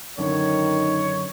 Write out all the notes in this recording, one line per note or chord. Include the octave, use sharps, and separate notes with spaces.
F#2 D3 D#3 C#5